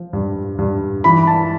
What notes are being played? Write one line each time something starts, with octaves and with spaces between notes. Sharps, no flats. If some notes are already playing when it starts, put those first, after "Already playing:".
Already playing: F3
G2
G2
E3 B5
A5